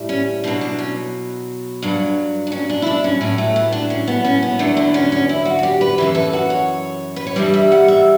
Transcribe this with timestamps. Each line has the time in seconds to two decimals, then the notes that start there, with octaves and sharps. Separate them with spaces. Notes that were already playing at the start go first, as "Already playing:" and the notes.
Already playing: A2 G3
0.09 C#4
0.44 B2 F#3 D4
0.61 D4
0.78 C#4
1.82 G2 F#3
2.47 D4
2.52 C#4
2.70 D4
2.82 E4
2.86 D4
3.04 C#4
3.21 A2 F#3 C#4
3.38 A3
3.56 B3
3.72 D4
3.90 C#4
4.08 B3
4.24 C#4
4.43 B3
4.59 E2 D3 F#3 A3
4.77 B3
4.94 C#4
5.12 C#4
5.29 E4
5.45 F#4
5.59 F#4
5.63 G4
5.81 B4
5.98 F#2 C#3 E3 B4
6.15 A4
6.33 F#4
6.50 C#5
7.16 B4
7.27 C#5
7.36 G2 E3 G3 D5
7.54 E5
7.72 F#5
7.88 E5